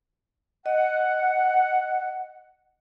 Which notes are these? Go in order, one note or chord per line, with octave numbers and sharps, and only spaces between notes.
D#5 F#5